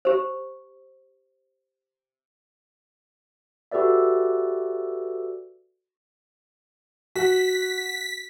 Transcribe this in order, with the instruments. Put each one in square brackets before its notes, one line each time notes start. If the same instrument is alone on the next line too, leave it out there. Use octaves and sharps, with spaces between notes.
[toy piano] G4 C5
[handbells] F#4 G4 A4 B4 D5 E5
[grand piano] F#4 [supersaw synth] B6